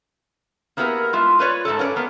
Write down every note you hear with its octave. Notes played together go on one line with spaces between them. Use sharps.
A#3 B3 E4 G4 G#4 A#4
G#3 F4 E5
F4 B4 C#5 D5
G#2 E3 A3 A4
C#4 F4 A#4 B4 D5
A#3 B3